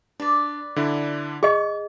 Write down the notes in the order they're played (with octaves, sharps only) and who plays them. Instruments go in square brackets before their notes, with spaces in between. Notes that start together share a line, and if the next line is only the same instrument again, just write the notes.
[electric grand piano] D4 [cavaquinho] B4 D5
[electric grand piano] D3 D4 E4
[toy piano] G#4 D#5 [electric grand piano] C#6